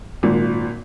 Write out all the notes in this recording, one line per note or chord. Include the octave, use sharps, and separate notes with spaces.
G#1 A#2